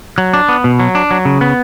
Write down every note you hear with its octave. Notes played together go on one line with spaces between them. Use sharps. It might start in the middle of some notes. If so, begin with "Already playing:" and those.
F#3
D4
B3
B2
F#3
D4
F#3
C#3
B3